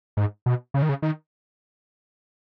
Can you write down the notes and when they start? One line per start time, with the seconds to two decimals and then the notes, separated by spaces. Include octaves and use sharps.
0.17 G#2
0.46 B2
0.74 C#3
0.82 D#3
0.89 C#3
1.02 D#3